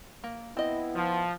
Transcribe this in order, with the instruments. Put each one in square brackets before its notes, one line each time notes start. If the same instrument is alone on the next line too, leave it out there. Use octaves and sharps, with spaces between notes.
[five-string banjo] A#3
[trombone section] B3 E4 [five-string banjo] C4 D#5
[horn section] F3